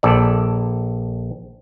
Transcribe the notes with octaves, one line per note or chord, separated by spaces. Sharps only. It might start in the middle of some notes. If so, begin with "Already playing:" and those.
A#1 A4 D5